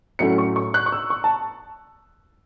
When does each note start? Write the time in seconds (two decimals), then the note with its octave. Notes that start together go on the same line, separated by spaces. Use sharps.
0.19 A2 F#3 A3 C#4 C#7
0.38 C#6
0.56 C#6
0.74 F#6
0.86 C#6
0.92 E6
1.10 C#6
1.24 A5